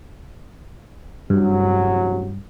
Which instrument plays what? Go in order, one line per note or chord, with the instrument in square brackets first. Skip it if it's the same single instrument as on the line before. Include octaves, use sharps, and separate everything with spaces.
[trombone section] A1 C3 F#3 [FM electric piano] G2